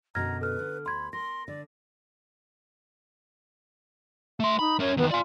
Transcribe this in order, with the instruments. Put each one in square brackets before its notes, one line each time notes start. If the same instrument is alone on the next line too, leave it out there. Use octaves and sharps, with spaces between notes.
[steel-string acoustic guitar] F#2 B2 D3 [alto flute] A#5 [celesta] F6 G#6 A#6
[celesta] A4 F6 [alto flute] B4
[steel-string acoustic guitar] D3
[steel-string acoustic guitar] D2 [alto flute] B5 [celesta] C6 G#6
[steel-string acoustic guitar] A#4 [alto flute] C6 [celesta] A#6
[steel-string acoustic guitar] D3 [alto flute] D5
[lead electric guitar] A3 C6 [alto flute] E5
[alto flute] D#4 [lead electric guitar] B5
[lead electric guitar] C#4 A#4 [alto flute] C#5
[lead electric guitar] E2 D#3 [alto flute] B3
[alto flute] F4 [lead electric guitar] D5 G#5